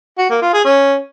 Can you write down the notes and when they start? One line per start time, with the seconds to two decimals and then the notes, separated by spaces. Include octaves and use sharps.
0.18 F#4
0.30 A#3
0.41 F4
0.53 G#4
0.65 C#4